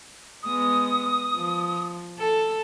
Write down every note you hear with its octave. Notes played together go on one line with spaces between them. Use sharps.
G#3 B3 D#6
F3
A4